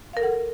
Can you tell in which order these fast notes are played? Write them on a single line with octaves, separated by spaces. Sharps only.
F5 A#4 A4 F#5